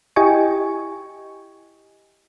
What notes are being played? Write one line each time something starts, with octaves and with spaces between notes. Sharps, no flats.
E4 G4 D#5 G5 G#5 C#6